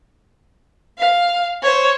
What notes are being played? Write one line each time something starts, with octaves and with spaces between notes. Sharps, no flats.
F5
C5 C#5